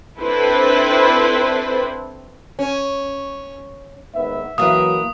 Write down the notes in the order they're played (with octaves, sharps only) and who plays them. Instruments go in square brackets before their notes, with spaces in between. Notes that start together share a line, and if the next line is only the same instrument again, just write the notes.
[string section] C4 D4 E4 A4 B4 C5
[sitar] C#4
[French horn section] D#2 G#2 B3 [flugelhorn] E5
[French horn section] E3 F#3 [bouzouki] A#3 A#4 B4 [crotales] D#6